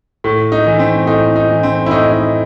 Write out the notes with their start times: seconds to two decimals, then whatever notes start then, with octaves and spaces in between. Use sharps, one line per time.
0.24 A2
0.52 D#4
0.66 E3
0.79 C4
1.07 A2 D#4
1.36 D#4
1.49 E3
1.63 C4
1.86 E4
1.91 A2 D#4
2.12 D#4